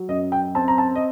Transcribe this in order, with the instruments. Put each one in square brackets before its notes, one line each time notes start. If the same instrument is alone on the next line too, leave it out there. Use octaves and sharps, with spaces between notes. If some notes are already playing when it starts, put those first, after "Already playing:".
Already playing: [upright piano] F#3
F#2 D#5
G5
C4 A5
A#5
A5
D#5